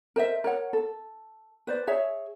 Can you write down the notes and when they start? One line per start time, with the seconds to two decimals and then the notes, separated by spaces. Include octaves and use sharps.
0.16 A#4 C5 D#5 E5
0.44 A#4 C#5 F#5
0.73 A4
1.67 B4 C5 D5
1.87 G#4 C#5 E5